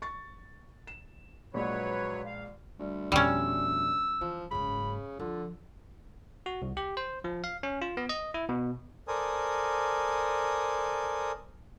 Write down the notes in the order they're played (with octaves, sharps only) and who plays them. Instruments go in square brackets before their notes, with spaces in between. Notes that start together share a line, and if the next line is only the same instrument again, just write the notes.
[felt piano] C#6 A6
E7
[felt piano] A#1 G#3 [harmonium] F#3 B4 C#5
[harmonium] F5
[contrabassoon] D2 [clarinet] G3
[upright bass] F2 B2 [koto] G3 C#4 [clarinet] E6
[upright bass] E3 [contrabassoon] F3
[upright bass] F#1 G#2 [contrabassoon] C#3 [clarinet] B5
[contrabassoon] D3 [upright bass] F3 [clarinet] F4
[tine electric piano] F#4
C2
G4
C5
F3
F5
C#4
F4
B3
D#5
E4
B2
[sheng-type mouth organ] A4 A#4 C5 D5 G#5 D#6